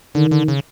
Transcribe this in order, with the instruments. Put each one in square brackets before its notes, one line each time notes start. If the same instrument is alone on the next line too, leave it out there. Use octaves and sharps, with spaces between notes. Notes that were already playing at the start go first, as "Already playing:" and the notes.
[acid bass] D3 [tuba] D#3
[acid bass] D3
C#3